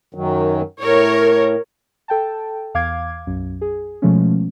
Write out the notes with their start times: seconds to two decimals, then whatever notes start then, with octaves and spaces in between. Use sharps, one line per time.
0.15 F#2 D#3 F#3
0.80 A2 A#4 C#5
2.08 A4 G5 A5
2.74 E2 F5 D6 G#6
3.27 B1 F#2
3.61 G#4
4.02 B2 F3 G#3 A3 B3 C#4